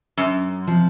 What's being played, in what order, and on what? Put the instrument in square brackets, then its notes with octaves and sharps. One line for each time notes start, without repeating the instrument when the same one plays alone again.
[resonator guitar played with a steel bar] F#2
[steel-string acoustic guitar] C3 F3